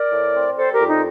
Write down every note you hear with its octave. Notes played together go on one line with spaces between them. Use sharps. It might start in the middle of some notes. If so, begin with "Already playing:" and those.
Already playing: A#4 D5
A2
C4
G3 A4 C5
G4 A#4
F2
D#4